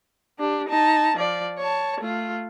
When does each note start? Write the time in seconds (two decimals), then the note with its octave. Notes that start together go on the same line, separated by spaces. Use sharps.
0.39 D4 G4
0.69 D#4 A5
1.17 F3 D5
1.58 C#5 A5
2.01 A3 F4